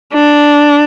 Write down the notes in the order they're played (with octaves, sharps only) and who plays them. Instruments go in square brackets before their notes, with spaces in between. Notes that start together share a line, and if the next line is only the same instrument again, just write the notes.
[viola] D4